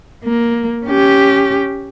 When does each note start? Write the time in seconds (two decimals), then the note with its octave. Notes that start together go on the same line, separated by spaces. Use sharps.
0.24 A#3
0.86 C#4 G4